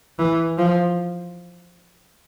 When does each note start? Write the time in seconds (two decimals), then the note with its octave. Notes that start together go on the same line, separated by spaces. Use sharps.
0.19 E3
0.58 F3